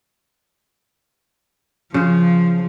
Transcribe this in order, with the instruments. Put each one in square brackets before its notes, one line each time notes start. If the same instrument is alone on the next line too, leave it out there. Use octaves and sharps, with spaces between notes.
[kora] C#3 C5 [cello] F3